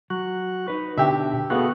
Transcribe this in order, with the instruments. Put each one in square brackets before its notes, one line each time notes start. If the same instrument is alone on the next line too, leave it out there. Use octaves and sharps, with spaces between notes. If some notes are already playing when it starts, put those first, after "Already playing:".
[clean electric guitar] F#3 [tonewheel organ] F#4
[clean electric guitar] D#4 B4
[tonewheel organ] B2 [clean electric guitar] D3 F#4 [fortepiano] G4 E5
[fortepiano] A3 B3 [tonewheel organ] F#4 [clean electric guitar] G#4 F5 F#5